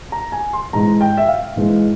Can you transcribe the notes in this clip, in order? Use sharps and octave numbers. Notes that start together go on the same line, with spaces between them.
A#5
G#5
C6
G#2 E3 G#3 A#5
G5
E5
F5
G#2 E3 G#3